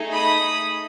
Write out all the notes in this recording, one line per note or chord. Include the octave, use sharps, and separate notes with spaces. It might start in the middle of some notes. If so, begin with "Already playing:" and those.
Already playing: A3 D#4 G#4
B5 D#6